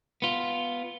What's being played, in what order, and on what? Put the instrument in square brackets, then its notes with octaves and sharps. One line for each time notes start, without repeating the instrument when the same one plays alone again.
[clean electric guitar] B3 F4